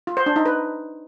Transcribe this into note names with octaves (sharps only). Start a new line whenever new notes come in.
F4
C5
D4
D#4
B4